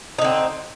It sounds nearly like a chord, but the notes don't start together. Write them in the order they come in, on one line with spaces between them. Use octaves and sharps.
D#4 D3 C4